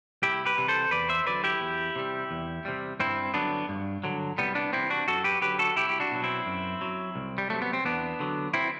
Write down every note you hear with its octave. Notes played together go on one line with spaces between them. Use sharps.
C2 E4 G4
G4 B4
C3 E3 G3
A4 C5
E2 B4 D5
C5 E5
D3 F#3 B4 D5
E4 G4
E2
C3 G3
E2
C3 G3
G2 C4 E4
D3 F#3 B3 D4
G2
D3 F#3
C2 G3 B3
B3 D4
C3 E3 C4 E4
D4 F#4
F#2 F#4 A4
G4 B4
D3 F#3 G4 B4
F#4 A4
C2 E4 G4
G4
D4 F#4
B2 F#3
C4 E4
F#2
F#3
C2
G3
C3 F#3 A3
B3
C4
E2 B3 D4
D3 F#3
C4 E4